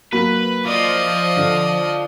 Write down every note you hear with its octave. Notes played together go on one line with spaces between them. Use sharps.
F#3 A#3 B4
F3 F4 D5 D#5
D3